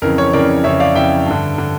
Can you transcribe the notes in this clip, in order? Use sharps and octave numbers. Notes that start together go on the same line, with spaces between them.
F2 C#3 E3 A#4
C#5
F2 C#3 E3 A#4 D5
F2 C#3 E3 C#5 E5
D5 F5
F2 C#3 E3 E5 G5
G2 D3
D3